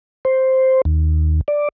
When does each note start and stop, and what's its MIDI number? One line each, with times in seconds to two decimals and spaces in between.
0.25 0.82 72
0.85 1.41 39
1.48 1.69 74